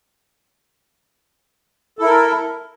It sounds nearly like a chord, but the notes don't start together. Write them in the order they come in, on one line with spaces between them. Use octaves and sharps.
A4 E4 A#4